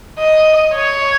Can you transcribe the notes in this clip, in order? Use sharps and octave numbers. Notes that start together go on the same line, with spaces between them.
D#5
C#5